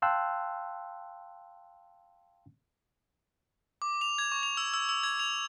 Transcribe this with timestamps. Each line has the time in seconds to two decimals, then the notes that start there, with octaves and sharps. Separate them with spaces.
0.02 F5 G5 A5 C6 E6 F#6
3.82 D6
4.01 F7
4.18 G#6
4.32 C#6
4.43 F7
4.57 E6
4.74 E6
4.89 E6
5.03 G#6
5.19 F7